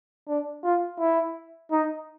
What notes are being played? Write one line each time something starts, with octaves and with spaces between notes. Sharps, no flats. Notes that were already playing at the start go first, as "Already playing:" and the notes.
D4
F4
E4
D#4